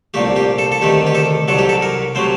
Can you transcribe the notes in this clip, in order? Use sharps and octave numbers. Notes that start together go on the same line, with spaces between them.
C2 A#2 A3 G4
G4
A4
A4
D2 C3 D#3 A3 G4
G4
A4
C2 C3 F#3 A4
G4
A4
A#4
C3 F#3 A3 C5